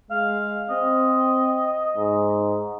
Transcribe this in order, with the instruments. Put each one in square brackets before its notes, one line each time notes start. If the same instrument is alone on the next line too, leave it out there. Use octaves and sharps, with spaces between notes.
[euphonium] G#3 [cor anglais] F5
[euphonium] C4 [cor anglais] D#5
[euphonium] G#2